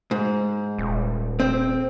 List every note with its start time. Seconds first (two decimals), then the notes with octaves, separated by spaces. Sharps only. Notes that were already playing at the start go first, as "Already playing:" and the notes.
0.11 G#2
0.78 D#1
1.40 C4